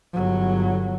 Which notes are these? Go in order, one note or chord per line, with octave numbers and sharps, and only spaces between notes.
G1 F#3